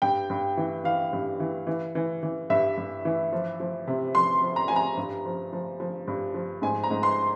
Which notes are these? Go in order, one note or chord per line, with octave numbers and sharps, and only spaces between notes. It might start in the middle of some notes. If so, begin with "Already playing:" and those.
G2 G5
G2
E3
E3 F5
G2
E3
E3
E3
E3
G2 E5
G2
E3
F3
F3
C3
F3 C6
F3
A#5
F3 G#5
A#5
G2
F3
F3
F3
G2
F3
G#2 G#5
A#5
G#2
C6